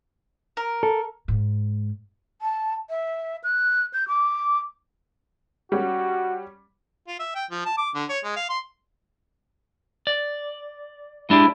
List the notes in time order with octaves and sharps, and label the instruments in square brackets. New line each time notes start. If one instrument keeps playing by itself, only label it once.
[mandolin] A#4
[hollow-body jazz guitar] A4
[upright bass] G#2
[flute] A5
E5
F#6
G6
D6
[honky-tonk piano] G3 C#4 [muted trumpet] F#4
[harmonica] F4
E5
G5
F3
A5
D6
D3
C#5
G#3
F5
C6
[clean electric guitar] D5
[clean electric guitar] G#3 D4 G4 [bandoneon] E4